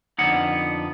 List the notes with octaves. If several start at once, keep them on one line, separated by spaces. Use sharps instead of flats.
F2 D3 F#3 B3 D#4 F#5